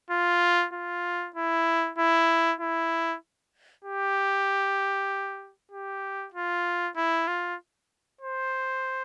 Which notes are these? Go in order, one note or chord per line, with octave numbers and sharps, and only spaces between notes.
F4
F4
E4
E4
E4
G4
G4
F4
E4
F4
C5